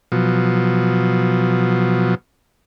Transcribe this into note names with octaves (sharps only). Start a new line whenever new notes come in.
B2 F3 F#3